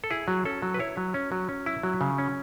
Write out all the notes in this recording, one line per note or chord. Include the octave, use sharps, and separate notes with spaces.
A4
E4 G#4
F#3
C#4 A4
F#3
B4
E4 C#5
F#3
C#4
F#3
C#4
E4
F#3
C#3
C#4